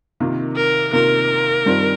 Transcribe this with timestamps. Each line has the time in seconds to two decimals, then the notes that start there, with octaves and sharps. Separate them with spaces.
0.20 C3 D#3 A#3 F4
0.56 A#4
0.93 C3 D#3 A#3 F4 A#4
1.66 G2 D#3 G3 C4 F4